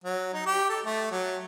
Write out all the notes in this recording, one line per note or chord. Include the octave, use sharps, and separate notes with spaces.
F#3
D#4
G4
A4
A3
F#3